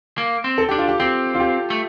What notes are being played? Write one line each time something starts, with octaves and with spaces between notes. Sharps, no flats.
A#3
C4
A4
D4 G4
F4
G4
C4 G4
F4
G4
A3